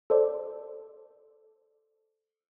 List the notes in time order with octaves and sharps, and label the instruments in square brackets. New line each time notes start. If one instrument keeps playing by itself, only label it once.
[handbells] A4 C5 D5